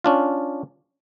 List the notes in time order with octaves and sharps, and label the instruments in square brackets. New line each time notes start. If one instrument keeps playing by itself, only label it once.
[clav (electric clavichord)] C#4 D4 F4